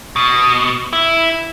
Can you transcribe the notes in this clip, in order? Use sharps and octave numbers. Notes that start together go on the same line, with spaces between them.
B2
E4